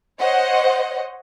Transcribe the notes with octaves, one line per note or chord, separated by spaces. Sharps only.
C5 C#5 D#5 F#5